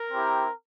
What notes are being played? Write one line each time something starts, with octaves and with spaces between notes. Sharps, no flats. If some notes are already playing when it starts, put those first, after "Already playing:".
Already playing: A#4
C4 E4 G4